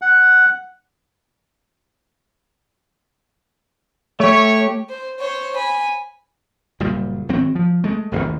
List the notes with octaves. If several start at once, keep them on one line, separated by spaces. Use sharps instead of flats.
F#5
A3 G4 C#5
C5
C5 C#5
G#5 B5
F#1 A#2 G3
G#1 F#3 C4
F3
G#3 A3
E1 A1 D#2